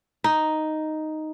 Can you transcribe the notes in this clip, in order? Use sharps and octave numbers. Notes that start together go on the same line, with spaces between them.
D#4